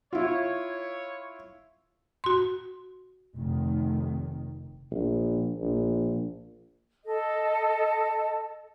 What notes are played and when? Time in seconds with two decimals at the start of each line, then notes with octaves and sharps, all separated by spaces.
0.13 E4 F4 C#5
2.24 F#4 C6
3.36 F1 D#3
4.91 A#1
5.57 A#1
7.04 A4 D#5